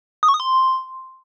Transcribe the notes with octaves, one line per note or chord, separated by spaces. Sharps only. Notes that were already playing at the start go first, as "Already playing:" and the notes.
D#6
C#6
D#6
C6